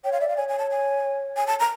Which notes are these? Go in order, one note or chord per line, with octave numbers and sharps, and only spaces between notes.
C#5 G5
F5
D5 E5
F5
C#5 G#5
G#5
A5
G#5
G#5
A5
A#5